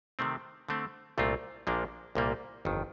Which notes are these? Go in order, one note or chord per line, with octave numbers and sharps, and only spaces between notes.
C3 D#3 A3 C4
D3 A3 C4
C2 A#2 A3 C4 F4
A#1 A#2 F3 A#3 D4
C2 A#2 G3 A#3
G1 F2 D#3